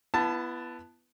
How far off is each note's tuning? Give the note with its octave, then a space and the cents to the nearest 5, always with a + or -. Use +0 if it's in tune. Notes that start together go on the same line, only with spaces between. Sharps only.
B3 +0 E4 +35 A5 +0